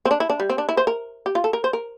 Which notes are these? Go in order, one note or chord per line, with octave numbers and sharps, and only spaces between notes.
C4
D4
E4
D4
G3
C4
D4
E4
C5
A#4
G4
F4
A4
A#4
C5
A#4